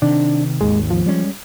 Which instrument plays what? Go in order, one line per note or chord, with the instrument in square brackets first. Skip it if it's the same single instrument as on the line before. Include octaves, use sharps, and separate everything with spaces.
[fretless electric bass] C3 D#3 [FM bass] D4
[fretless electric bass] G#1 D#2 [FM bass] G#3
[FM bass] F3
[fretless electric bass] G3 G#3 C#4